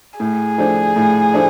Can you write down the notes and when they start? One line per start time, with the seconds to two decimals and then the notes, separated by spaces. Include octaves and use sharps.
0.19 A2 G#4
0.58 F3 A3 D4
0.96 A2
1.34 F3 A3 D4